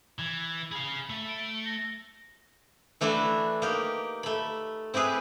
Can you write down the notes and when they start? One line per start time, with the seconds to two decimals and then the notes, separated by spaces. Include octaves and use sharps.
0.19 E3 G#6
0.72 G#4 F5 B5
1.10 A3
1.28 D7
1.66 A#6
3.01 E3 A3 D4 E4 F#4
3.62 A#3 D#4 G4
4.23 A3 B5
4.94 C4 E4 G4 G#4 B4